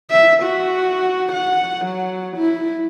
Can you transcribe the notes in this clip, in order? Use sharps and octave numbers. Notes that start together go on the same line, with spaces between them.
E5
F#4
F#5
F#3
E4